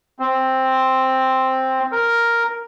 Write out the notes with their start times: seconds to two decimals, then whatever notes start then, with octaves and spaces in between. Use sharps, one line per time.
0.19 C4
1.92 A#4